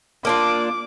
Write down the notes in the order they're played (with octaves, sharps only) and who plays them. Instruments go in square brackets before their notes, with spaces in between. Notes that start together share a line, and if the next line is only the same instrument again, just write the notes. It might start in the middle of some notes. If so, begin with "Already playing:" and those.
[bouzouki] A#3 D4 F4 [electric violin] D6